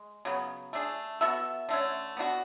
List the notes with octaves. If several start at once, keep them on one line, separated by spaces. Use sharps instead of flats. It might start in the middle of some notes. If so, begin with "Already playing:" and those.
Already playing: G#3
C#3 F#3 B3
A3 D4 G#4
B3 F#4 A4 E5
D3 A3 C#4
B3 D4 F#4